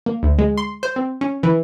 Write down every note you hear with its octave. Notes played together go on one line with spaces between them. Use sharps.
A#3
D2
G#3
C6
C5
C4
C#4
E3